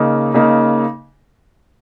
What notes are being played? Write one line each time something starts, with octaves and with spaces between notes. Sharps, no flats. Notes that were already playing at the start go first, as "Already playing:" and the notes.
Already playing: C#3 A#3 D#4
C#3 A#3 D#4